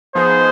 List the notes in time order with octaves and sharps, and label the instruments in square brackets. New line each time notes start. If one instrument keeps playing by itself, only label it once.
[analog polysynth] F3 B3 D#4 G#4 [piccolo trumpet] C5